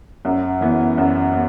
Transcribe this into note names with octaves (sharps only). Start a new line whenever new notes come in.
F#2
E3 B3
F#2
B3